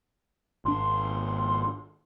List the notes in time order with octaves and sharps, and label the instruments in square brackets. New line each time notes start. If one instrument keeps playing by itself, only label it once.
[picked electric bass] G#1 D4 [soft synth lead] C6